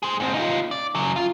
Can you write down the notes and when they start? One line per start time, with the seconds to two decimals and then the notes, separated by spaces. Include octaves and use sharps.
0.03 G#4 C5
0.20 G#2 C4
0.34 D#4 F4
0.71 D5
0.95 C#3 F#3
1.16 F4